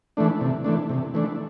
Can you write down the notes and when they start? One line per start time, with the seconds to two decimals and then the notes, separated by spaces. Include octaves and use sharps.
0.17 E3 A3 D4
0.41 C3
0.65 E3 A3 D4
0.89 C3
1.14 E3 A3 D4